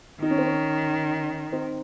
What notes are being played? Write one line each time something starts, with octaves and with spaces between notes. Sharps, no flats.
D#3 D#4
C#4
C4
C#4
C4 D#4